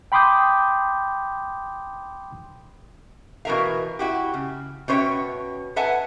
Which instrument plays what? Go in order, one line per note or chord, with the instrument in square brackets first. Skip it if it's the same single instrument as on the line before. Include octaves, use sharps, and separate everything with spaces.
[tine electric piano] G5 B5 C6 D6 D#6 G6
[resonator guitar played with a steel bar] B2 E3 A3 A#4 E5 F5
E4 F#4 G4
C#3
B2 C#4 C5 C#5 E5 G5
A4 B4 E5 F#5 G#5 A5